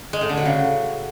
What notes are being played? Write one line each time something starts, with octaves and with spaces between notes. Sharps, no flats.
G#3
A2
D3
F#3
C#3